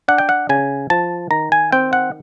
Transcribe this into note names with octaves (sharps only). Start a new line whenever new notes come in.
D4 F#5
G5
F#5
C#3 G#5
F3 A5
D#3 A#5
G#5
C4 G5
F#5